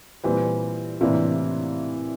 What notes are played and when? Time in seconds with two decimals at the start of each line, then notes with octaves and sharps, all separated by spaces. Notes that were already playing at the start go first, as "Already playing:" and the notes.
0.24 A#2 E3 G3 C4
1.01 A2 C3 E3 A#3 D4 F4